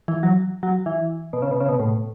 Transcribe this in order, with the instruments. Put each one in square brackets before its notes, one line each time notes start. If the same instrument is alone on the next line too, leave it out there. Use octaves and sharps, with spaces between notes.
[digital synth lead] E3
F#3
F#3
E3
B2
C#3
B2
C#3
B2
A2